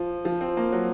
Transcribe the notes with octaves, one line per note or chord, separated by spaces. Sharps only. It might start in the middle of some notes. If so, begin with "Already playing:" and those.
Already playing: F3
F3
C4
A#3
F#3